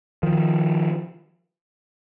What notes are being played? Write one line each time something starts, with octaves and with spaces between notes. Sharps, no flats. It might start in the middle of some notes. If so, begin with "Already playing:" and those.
D#3 F3